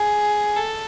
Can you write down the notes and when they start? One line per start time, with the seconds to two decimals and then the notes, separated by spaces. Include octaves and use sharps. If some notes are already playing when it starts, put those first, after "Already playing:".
Already playing: G#4
0.56 A4